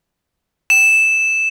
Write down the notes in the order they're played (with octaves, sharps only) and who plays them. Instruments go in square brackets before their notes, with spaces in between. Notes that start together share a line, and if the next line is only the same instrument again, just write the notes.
[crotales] E7